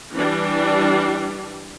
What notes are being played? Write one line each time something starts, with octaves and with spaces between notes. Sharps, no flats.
E3 G3 D4